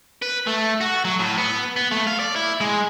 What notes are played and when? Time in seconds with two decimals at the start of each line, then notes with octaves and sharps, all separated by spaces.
0.22 B4
0.47 A3
0.81 F#4
1.05 F#3
1.20 A2
1.38 B3
1.76 B3
1.91 A3
2.07 F5
2.19 D5
2.36 E4
2.61 G#3